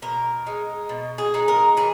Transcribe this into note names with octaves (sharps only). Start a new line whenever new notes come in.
B2 A#4
G#3 D#4
B2
G#4
G#3 D#4
A#4
E3 G#4